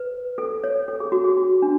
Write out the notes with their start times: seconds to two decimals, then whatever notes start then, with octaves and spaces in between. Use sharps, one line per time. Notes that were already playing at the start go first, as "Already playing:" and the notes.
Already playing: B4
0.38 A4
0.64 C#5
0.88 A4
1.00 G#4
1.12 F#4
1.24 G#4
1.37 F#4
1.62 D4